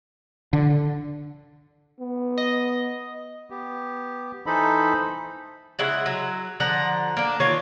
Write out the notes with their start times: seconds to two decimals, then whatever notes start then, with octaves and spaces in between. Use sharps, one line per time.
0.53 D3
2.00 B3
2.38 D#5
3.50 B3 G4
4.46 E3 D#4 A4 C5 D#5 B5
5.79 C#3 G#3 E4 F#5
6.06 F#3
6.60 D3 F3 F#5 A#5
7.17 A#3 D4
7.40 D#3 E3 F4 C#5